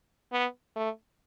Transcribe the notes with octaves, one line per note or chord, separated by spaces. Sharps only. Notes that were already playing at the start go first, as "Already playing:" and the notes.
B3
A3